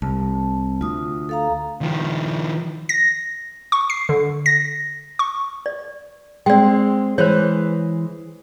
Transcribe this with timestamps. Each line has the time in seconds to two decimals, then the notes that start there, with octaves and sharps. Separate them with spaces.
0.02 C2 A5
0.81 D2 F4 D#6
1.29 A4 F5 A#5
1.81 D#3 F3
2.89 A#6
3.72 C#6
3.90 C7
4.09 D3
4.46 A#6
5.19 C#6
5.66 D5
6.46 G#3 C4 D5 G5
7.18 E3 G#3 C5 C#5